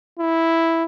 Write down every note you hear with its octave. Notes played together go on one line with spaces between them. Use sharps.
E4